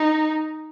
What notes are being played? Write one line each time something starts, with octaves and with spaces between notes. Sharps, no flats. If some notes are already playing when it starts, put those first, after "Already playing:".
Already playing: D#4